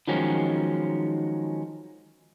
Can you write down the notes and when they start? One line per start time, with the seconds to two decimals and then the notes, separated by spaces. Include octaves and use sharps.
0.07 D#3 F3 F#3 G#3 C#4 D#4